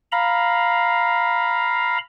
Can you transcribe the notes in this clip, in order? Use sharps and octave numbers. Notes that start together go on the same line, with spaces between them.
F5 A#5 B5